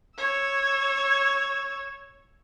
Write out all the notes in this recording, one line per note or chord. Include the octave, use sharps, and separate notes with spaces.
C#5 E6